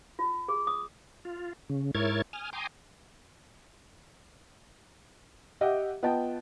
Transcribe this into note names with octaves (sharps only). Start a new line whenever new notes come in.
F4
G#4
D#6
F4
C#3
G#2 E4 A#4 C#5 G#6 A6
G#5 D#6 F6
G5 G#5 A#5 C6 D6 D#6
G4 D#5 E5 F#5
B3 F4 D#5 G5 A5